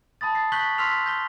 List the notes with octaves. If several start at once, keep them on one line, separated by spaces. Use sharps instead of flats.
A5 B5 D#6 A6
A6 A#6 C7
C#6 F#6 G6 B6 F#7 G7
C6 E6 F6 B6 C7 F7
G6 A#6 G7